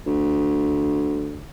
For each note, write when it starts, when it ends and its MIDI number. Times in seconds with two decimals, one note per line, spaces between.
0.07 1.44 38